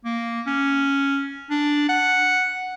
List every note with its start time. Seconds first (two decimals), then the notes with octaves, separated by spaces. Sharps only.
0.04 A#3
0.47 C#4
1.50 D4
1.89 F#5